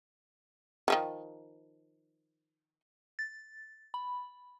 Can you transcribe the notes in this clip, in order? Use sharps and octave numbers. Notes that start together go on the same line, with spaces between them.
D#3 F3 F#3
A6
B5